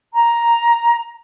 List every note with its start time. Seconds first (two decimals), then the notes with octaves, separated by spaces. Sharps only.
0.14 A#5